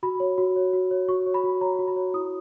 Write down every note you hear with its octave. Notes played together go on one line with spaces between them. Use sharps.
F#4 B5
C#5
F#4
C#5
F#4
C#5
F#4 C#6
C#5
B5
F#4
C#5 A#5
F#4
B5
C#5
E4 D#6